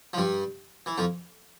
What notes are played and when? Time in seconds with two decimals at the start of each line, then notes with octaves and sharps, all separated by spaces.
0.13 F3
0.18 G2 G3
0.86 E3
0.98 F2 F3